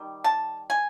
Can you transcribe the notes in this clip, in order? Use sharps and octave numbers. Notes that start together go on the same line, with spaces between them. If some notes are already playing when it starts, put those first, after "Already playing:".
Already playing: D#3 G3
A5
G#5